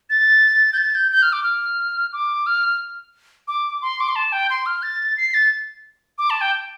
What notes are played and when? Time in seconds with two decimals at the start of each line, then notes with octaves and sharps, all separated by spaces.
0.10 A6
0.73 G6
0.77 A6
0.95 G6
1.12 G6
1.22 F6
1.33 D6
1.43 F6
2.13 D6
2.46 F6
3.48 D6
3.82 C6
4.00 D6
4.08 C6
4.16 A5
4.32 G5
4.50 C6
4.66 F6
4.83 A6
5.17 C7
5.34 A6
6.18 D6
6.30 A5
6.41 G5